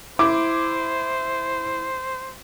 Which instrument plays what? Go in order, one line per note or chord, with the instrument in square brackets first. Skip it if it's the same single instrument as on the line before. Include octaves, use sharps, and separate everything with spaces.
[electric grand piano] E4 [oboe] C5 [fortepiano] D6